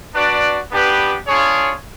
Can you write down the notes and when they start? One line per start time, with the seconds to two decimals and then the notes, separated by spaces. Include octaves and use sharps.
0.14 D4 F#4 B4 D5
0.71 B3 D4 G4 B4
1.27 D4 F4 G#4 C#5